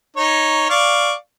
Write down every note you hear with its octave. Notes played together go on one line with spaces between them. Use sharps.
D#4 C#5
D5 F5 C#6